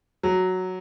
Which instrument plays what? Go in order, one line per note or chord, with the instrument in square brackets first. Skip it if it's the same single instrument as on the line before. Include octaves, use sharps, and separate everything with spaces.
[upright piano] F#3